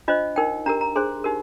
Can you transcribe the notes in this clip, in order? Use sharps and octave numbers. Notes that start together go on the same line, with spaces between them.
D4 F4 C5 D#5
D#4 A#4 G5
D4 G4 A#4 A#5
A#5
D4 G#4 C5 C6
D#4 G4 A#4